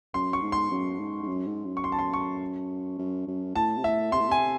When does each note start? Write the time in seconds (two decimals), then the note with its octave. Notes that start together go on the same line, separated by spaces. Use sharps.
0.14 F#2 C6
0.33 C#6
0.42 G#2
0.52 C6
0.71 F#2
0.99 G#2
1.22 G#2
1.28 F#2
1.47 G#2
1.66 F#2
1.77 C#6
1.84 C6
1.92 A5
1.99 C6
2.13 C#6
2.98 F#2
3.27 F#2
3.55 A2 A5
3.78 C3
3.84 A2 E5
4.12 C3 C6
4.21 A2
4.29 C3 G#5